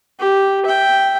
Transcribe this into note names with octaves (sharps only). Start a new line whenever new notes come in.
G4
E5 G5